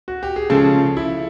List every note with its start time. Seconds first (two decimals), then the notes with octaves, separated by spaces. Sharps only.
0.08 F#4
0.23 G4
0.36 G#4
0.50 C#3 F3 G#3 C4 A4
0.97 E4